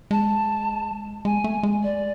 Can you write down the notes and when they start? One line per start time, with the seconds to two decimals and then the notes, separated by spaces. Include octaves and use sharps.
0.11 G#3 A5
1.25 G#3 G#5
1.44 A3
1.63 G#3
1.83 D5